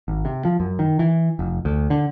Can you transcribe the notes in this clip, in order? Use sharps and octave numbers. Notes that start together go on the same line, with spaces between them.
G#1
C3
F3
F#2
D#3
E3
F1
D2
D3